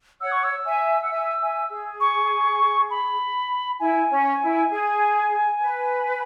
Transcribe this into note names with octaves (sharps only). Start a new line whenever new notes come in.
C#5 F#5 E6
C#6
E6
E5 G#5
F#5
E5 G#5
E5 G#5
G#4
C#6
B5
E4 G#5
C#4
E4
G#4
B4